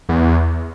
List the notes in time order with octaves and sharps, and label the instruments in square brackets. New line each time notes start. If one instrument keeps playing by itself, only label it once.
[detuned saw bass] E2